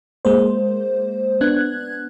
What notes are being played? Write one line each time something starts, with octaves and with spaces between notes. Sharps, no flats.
G#3 A#3 C5
B3 D4 F#6 G#6